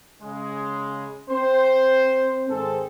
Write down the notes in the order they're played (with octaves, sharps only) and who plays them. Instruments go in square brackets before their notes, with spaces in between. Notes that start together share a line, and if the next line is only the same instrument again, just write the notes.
[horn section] C#3 G#3
[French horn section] C4 [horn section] C5
[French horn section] G#2 D#3 C5 [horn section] C4 G#4 A4